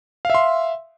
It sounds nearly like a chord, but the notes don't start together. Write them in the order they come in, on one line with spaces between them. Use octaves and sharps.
F5 E5 C6